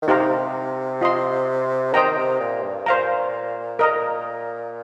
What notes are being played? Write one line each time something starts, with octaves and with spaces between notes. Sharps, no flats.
D#3
C3 D#4 G4 C5 F5 A#5
F4 D#5 C6
D#3 C5 D#5 G5 A#5
C3
A#2
G2
A#2 C5 F5 A#5
A#4 D#5 A#5